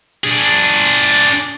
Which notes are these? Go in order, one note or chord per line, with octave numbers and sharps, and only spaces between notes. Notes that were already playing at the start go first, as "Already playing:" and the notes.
D4 G#4